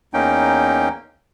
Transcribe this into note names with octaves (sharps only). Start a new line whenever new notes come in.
E2 A#3 C#4 D#4 G5